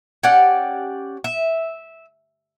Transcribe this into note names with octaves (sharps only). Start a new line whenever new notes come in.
C#4 G4 D5 F#5
E5